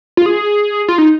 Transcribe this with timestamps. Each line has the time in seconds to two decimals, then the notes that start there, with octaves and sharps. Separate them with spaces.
0.17 F4
0.26 G#4
0.88 F4
0.98 D#4